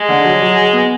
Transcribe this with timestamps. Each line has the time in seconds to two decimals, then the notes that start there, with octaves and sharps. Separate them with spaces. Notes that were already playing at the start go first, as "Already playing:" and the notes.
Already playing: G#3
0.09 D3
0.25 F#3
0.40 F#3
0.57 G#4
0.73 B3